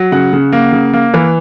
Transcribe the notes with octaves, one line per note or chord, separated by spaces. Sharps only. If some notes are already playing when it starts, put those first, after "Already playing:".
Already playing: F#3
C#3 F#5
C#3
A#3
C#3
A#3
E3